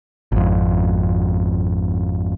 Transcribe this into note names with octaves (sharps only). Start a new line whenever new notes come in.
G#1 F2